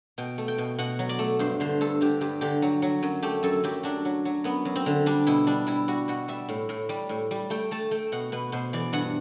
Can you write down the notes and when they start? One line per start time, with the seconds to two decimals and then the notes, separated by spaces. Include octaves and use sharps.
0.18 B2 G5
0.38 A3
0.48 G5
0.58 B2
0.78 B2 F#5
0.99 F#3
1.09 D5
1.19 A3
1.39 G2 C5
1.60 D3 C5
1.81 G2 A4
2.01 D3 G4
2.21 G2 G4
2.41 D3 G4
2.62 F#3
2.82 F#3
3.03 F#2
3.22 A3 G4
3.43 F#2 A4
3.64 F#2 G4
3.83 F#3 D4
4.05 F#3
4.25 F#3
4.44 F#2 B3
4.65 F#2
4.75 C4
4.86 D3
5.06 G3 D4
5.27 B2 E4
5.47 G3 D4
5.67 G3 E4
5.88 G3 F#4
6.08 B2 F#4
6.28 G3 E5
6.48 A2
6.69 A2
6.89 G3
7.09 A2
7.31 G3
7.50 A3 G5
7.71 A3 A5
7.91 A3 G5
8.12 B2 F#5
8.32 B2 B4
8.52 B2 C5
8.73 E3 D5
8.93 G2 F#5